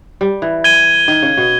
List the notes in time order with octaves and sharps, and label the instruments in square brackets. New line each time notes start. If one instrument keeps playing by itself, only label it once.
[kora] G3
E3
[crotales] G#6 D#7 G7
[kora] D#3
C#3
B2